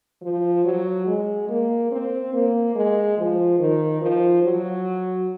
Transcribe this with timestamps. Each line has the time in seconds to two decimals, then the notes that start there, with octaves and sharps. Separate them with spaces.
0.22 F3
0.64 F#3
1.07 G#3
1.49 A#3
1.91 C4
2.33 A#3
2.75 G#3
3.18 F3
3.59 D#3
4.01 F3
4.43 F#3